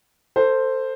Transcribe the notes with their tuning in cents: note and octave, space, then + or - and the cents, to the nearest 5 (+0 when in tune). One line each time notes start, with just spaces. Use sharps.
A4 +25 C5 +0